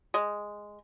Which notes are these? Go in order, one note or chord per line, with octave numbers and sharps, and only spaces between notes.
G#3